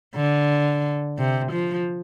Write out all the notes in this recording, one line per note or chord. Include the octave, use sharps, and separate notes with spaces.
D3
C3
F3